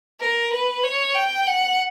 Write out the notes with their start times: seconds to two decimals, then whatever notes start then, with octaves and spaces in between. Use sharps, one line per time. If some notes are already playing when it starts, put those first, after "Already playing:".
0.20 A#4
0.52 B4
0.84 C#5
1.15 G5
1.46 F#5